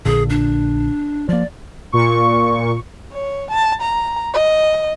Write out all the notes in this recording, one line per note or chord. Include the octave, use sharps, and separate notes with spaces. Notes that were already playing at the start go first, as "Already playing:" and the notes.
A#1 A#2 D3 G#4
D4
F3 A#3 D5
A#2 C#6
C#5
A5
A#5
D#5